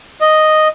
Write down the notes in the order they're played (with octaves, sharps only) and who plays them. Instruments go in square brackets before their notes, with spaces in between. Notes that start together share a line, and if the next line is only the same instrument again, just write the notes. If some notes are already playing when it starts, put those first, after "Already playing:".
[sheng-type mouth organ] D#5